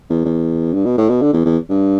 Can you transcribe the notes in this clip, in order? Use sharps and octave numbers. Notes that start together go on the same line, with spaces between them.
E2
E2
G2
B2
A2
B2
D3
E2
E2
G2